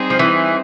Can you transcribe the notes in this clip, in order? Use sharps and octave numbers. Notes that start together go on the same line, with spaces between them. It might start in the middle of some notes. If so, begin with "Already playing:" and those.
Already playing: G3 C4 D#4 G#4 C5
F3
E3